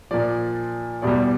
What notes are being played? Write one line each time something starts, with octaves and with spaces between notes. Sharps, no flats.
A#2 F3 D5
E2 B2 G3 D5